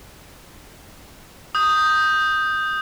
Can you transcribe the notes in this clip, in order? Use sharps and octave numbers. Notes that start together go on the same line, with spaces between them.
D#6 G6